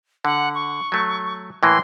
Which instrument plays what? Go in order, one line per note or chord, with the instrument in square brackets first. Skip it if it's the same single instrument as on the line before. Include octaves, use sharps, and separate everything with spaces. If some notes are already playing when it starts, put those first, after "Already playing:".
[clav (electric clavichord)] D3 [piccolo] F#5
[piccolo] C#6
[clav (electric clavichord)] F#3 A3
[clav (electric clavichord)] A2 E3 A#3 [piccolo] C6